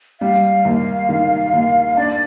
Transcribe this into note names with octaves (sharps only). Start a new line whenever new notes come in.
G3 F5
D#2
D#3
D#2
D4 D5